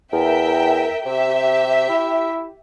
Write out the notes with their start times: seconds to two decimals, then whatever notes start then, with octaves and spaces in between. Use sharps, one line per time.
0.13 E2 A#4 E5 G5
1.06 C3 G4 E5
1.89 E4